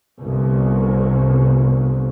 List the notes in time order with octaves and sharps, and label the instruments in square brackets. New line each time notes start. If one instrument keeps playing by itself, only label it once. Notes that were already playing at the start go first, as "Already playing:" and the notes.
[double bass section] G1 C2